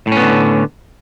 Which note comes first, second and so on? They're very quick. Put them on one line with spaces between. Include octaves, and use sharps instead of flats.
A2 C#4 B3 D3